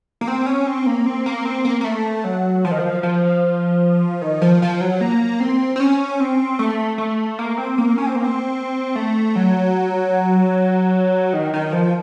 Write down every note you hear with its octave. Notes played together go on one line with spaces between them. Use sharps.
A#3
C4
C#4
C4
A#3
C4
A#3
C4
A#3
A#3
A3
F#3
F3
D#3
F3
F3
D#3
F3
F3
F#3
A#3
C4
C4
C#4
C4
A3
A3
A#3
C4
A#3
C#4
C4
A#3
C4
A3
F#3
D#3
D#3
F3